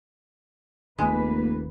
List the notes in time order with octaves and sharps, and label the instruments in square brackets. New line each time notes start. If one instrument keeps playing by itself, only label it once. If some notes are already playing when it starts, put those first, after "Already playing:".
[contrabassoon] F1 [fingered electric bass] D#2 [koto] G#3 [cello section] A#3 B4